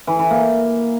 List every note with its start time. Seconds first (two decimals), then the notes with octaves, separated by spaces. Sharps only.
0.07 E3
0.19 E3
0.31 A#3